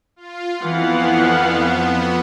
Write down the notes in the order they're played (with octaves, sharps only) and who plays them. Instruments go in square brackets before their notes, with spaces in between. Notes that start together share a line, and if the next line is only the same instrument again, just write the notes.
[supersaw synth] F4
[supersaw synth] F2 B3 [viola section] E3 F5 F#5